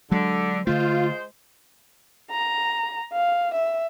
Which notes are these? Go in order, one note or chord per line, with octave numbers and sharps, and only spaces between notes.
D3 F#3 G#3
D3 G#3 A3 F4 C5
A#5
F5
E5